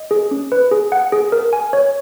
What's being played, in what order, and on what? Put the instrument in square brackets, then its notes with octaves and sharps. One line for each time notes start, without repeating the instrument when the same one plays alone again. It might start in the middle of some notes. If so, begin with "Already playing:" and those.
Already playing: [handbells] D#5
G#4
C#4
B4
G#4
F#5
G#4
A#4
G#5
C#5